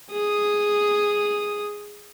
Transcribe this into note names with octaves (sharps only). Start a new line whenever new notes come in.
G#4 D#6